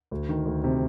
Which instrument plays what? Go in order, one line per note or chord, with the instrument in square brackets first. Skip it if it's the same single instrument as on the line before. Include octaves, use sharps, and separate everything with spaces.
[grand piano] D2
D#3
D2
C3